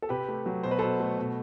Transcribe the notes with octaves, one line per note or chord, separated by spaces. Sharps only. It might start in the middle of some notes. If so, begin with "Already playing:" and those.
A4
C3 G4 B4
A3
F#3
B2 C5
B4
B2 A4 C5
A3
B2